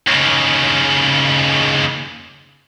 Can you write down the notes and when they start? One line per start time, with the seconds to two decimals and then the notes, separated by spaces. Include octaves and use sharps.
0.08 D#2 C#3